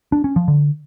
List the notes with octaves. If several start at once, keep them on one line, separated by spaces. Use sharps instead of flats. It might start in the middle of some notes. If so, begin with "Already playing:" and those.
D4
C#4
F3
D3